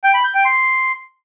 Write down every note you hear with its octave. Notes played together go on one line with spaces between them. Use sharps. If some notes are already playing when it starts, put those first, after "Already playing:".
G5
B5
G6
G5
C6